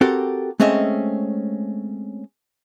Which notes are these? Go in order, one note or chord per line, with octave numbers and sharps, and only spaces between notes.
C4 F#4 G4 A4 A#4
G#3 A3 C4 C#4 D#5 E5